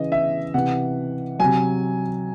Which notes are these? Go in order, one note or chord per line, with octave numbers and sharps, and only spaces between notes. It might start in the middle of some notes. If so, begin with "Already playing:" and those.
Already playing: C#3 E3 D#5
E5
C3 E3 F#5
F#3 G#5
C3